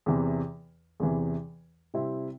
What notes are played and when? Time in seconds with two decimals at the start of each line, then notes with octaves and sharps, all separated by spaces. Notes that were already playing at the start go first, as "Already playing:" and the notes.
0.06 E2 C3 E3
1.00 E2 C3 E3
1.94 C3 G3 C4 E4